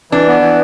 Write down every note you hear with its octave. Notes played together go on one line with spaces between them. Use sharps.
E3 D4
B3
E3